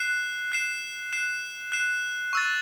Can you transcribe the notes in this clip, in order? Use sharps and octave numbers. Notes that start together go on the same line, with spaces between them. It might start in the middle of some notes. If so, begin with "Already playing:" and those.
Already playing: F#6 C7 E7
F#6 C7 E7
F#6 C7 E7
F#6 C7 E7
C#6 E6 A6